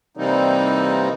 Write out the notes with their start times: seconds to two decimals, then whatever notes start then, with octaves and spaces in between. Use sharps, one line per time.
0.17 C3 E3 G3 A#3 C4 D#4